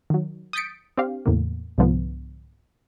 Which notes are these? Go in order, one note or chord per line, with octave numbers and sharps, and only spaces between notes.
D#3 F#3
D#6 G6 A6 B6 C#7 D7
C4 D4 G4 F5
E2 A2 C#3 A#3
C2 G#2 D3 F3 B3